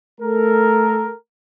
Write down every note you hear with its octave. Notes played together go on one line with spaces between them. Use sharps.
A3 A4 A#4